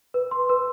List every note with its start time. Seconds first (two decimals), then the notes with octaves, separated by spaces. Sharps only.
0.14 B4
0.31 C6
0.49 B4